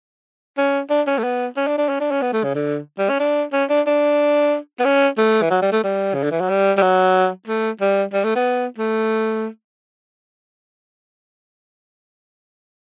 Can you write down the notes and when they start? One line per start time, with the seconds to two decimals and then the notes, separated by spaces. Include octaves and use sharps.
0.57 C#4
0.90 D4
1.07 C#4
1.18 A3
1.24 B3
1.57 C#4
1.67 D4
1.78 D4
1.89 C#4
2.00 D4
2.11 C#4
2.22 B3
2.33 A3
2.44 C#3
2.55 D3
2.98 G3
3.09 C#4
3.20 D4
3.53 C#4
3.70 D4
3.87 D4
4.79 B3
4.85 C#4
5.18 A3
5.42 E3
5.50 F#3
5.62 G3
5.72 A3
5.84 G3
6.14 C#3
6.23 D3
6.31 E3
6.41 F#3
6.49 G3
6.77 G3
6.82 F#3
7.47 A3
7.81 G3
8.13 G3
8.24 A3
8.36 B3
8.78 A3